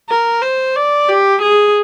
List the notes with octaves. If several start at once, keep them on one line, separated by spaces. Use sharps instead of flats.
A#4
C5
D5
G4
G#4